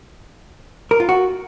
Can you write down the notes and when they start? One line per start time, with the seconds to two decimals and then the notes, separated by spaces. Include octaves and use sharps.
0.91 A#4
1.00 F4
1.09 F#4